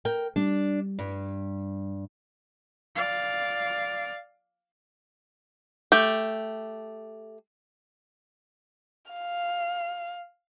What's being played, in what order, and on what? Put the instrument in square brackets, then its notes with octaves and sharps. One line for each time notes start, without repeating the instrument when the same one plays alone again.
[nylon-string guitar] A#4 G5
[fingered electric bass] G3 [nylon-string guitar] D4
[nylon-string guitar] G2
[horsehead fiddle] D5 F5
[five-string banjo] A3 G4
[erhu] F5